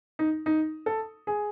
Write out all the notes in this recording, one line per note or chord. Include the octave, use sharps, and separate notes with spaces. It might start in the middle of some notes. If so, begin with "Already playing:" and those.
D#4
D#4
A4
G#4